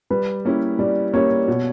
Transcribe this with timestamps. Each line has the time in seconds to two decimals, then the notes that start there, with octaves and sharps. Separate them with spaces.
0.10 G3 B4
0.45 A#3 C#4 E4 G4
0.79 G3 D5
1.14 A#3 C#4 E4 G4 C#5
1.48 B2